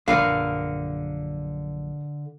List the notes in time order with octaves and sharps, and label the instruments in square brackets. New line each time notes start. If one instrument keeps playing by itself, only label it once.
[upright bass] A#1 F#2 [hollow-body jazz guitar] D3 B4 D5 [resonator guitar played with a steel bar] A#4 F5